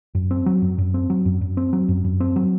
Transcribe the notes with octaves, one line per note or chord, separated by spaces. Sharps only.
F#2
C4
F#3
F#2
F#2
C4
F#3
F#2
F#2
C4
F#3
F#2
F#2
C4
F#3